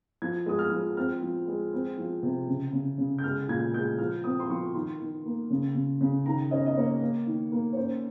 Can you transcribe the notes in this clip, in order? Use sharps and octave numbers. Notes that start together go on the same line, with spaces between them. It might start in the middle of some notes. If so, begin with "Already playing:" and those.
F3 G#6
G#3 D#6
F6
F3
C4 F6
F3
G#3
C4
F3
C3
C#3
C#3
C#3
G6
G#3 F6
A#2 G#6
G#3 G6
F3 F6
C4 D#6
C6
F3 C#6
D#3 C6
D#3
A#3
C#3
C#3
C#3
D#3 A#5
C#4 D#5
D#5
A#3 C#5
A#3
D#3
A#3
C#5
C#4 C5